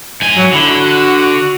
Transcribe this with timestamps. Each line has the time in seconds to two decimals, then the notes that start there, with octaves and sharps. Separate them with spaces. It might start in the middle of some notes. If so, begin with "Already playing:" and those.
0.22 G#2 G#5
0.35 F#3
0.53 D3 E4
0.69 F#4